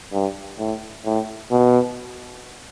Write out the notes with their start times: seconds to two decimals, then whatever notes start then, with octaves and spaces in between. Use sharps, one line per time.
0.13 G2
0.59 A2
1.05 A2
1.51 B2